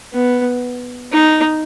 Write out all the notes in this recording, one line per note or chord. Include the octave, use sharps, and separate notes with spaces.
B3
D#4